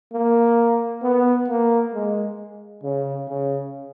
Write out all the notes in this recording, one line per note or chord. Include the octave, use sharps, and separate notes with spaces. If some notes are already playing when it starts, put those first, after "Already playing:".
A#3
B3
A#3
G#3
C#3
C#3